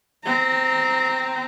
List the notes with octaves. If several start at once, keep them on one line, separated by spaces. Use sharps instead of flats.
C4 A#5